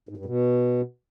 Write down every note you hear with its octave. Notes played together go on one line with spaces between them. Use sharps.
G#2
G2
B2